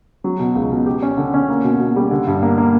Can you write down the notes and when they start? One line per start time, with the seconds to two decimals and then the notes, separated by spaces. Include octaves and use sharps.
0.24 F#3
0.39 B2
0.55 C#2
0.72 B2
0.86 G4
1.02 C#4
1.17 D3
1.34 C#4
1.49 A#3
1.64 B2
1.80 B2
1.96 G3
2.11 D3
2.27 G2
2.42 A#3
2.58 A#3